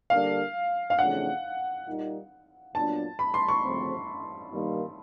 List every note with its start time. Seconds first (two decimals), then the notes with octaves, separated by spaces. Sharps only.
0.10 D3 G3 A#3 D4 F5
0.90 F5
0.99 F2 C#3 E3 A3 D4 F#5
1.87 A#2 G3 A#3 D#4
2.75 A#2 F#3 B3 D4 A5
3.19 B5
3.34 C6
3.48 C#6
3.64 D2 C#3 F3 A3 C4
4.52 G2 D#3 G3 A#3 D#4